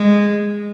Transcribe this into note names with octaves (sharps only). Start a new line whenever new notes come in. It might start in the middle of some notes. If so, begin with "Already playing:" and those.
Already playing: G#3